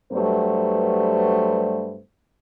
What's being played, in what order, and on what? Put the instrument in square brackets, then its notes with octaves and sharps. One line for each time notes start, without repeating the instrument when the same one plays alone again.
[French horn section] G2 F#3 G3 A3 B3 C5